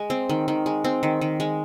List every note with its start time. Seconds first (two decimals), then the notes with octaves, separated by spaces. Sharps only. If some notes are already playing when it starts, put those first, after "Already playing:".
Already playing: G#3
0.10 C4
0.29 D#3
0.48 D#3
0.66 G#3
0.84 C4
1.03 D#3
1.21 D#3
1.40 G#3